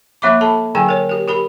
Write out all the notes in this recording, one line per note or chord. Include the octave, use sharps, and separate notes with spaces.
F3 A#3 E5 B5 D6
A4 A5 B5
D3 F#3 G#4 G5 G#5
A#4 C#5
G4 A#4
G4 A#4 B5